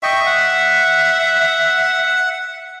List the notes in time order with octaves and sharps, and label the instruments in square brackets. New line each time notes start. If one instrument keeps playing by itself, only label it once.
[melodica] D#5 G5 C#6 [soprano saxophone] E5
[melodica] F#5